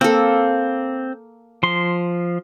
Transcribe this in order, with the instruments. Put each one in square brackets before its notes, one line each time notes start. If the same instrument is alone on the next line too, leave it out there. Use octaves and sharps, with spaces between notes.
[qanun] A#3 A4 [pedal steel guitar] C4
[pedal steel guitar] F3 C6